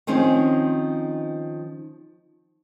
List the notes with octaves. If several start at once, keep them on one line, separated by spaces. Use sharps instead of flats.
D#3 F3 C4 C#4 D#4 G#4